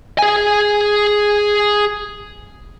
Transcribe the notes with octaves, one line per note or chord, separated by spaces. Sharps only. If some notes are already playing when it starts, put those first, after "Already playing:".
G#4 G#5